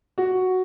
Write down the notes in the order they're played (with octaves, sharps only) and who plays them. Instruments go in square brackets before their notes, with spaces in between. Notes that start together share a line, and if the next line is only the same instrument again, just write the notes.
[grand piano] F#4